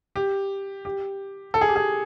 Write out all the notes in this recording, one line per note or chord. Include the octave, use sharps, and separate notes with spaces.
G4
G4
A4
G#4
G4
G#4